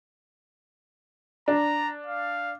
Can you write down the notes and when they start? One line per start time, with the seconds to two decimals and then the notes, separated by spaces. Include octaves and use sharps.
1.48 D4 A#5
2.07 F5